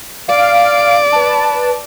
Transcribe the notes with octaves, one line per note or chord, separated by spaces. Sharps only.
D5 F5 D7
B4 A5